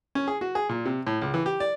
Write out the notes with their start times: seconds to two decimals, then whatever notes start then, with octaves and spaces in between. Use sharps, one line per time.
0.15 C#4
0.28 G#4
0.41 F#4
0.55 G#4
0.69 A#2
0.86 C3
1.07 A2
1.22 C#2
1.34 E3
1.46 G4
1.60 D5